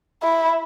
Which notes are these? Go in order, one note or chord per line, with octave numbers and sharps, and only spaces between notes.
E4